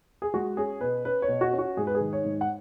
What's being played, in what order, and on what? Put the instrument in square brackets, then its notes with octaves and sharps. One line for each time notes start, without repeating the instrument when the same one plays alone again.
[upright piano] G#4
G#3 F#4
C#4 G#4
B2 B4
C#4 B4
C#5
B2
F#4
C#4
F#4
G#2 G#4
B4
G#4
D#3
C#5
G#2
F#5